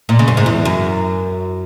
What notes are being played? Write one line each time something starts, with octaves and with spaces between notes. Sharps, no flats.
A#2
C#3
F#2
G#2
E2
F#2